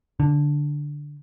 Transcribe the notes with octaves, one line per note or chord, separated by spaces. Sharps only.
D3